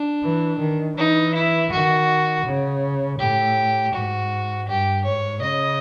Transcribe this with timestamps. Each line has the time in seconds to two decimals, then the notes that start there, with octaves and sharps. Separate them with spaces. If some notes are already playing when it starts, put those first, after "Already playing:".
Already playing: D4
0.23 E3
0.60 D#3
0.97 E3 D#4
1.34 E4
1.72 D#3 F#4
2.46 C#3
3.19 A2 G4
3.93 G#2 F#4
4.68 G2 G4
5.04 G#2 C#5
5.41 C#3 D#5